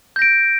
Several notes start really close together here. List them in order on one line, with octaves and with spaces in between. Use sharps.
G6 A#6 D7